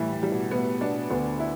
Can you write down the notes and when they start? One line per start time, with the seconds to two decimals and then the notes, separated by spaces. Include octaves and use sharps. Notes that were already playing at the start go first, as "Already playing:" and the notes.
Already playing: A2 E3 G3
0.12 A2
0.23 G3
0.32 B2
0.51 A2 B3
0.81 B2 D4
1.10 D2 D3 B3
1.40 E4